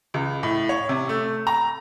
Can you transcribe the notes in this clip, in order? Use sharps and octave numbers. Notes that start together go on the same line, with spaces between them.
C#2
A2
C#5
C3
A3
A#5